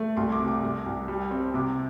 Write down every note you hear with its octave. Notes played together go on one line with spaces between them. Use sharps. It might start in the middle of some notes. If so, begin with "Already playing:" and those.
Already playing: A3
C2 C6
D6
C3
D6
C2
C2
G3
C4
C3 D6